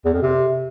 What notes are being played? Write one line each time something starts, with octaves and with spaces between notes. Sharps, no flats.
E2
F2
C3